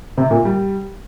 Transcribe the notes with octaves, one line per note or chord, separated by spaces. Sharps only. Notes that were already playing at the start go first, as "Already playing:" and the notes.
C3 C4
A#2 A#3
G3